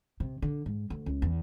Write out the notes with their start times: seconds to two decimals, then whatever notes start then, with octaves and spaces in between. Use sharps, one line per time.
0.20 C3
0.42 D3
0.66 G#2
0.90 D2
1.06 C#2
1.22 E2